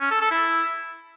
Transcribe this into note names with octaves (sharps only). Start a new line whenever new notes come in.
C#4
A4
A4
E4